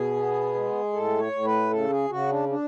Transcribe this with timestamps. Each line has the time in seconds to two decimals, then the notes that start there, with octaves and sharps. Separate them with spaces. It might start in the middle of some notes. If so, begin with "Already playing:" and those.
Already playing: B2 G#4
0.16 B3
0.54 G#3
0.93 A2 A4
1.19 C#5
1.32 A2
1.44 B4
1.71 C#3 A4
1.90 G#4
2.10 C#3 F#4
2.29 D4
2.49 D4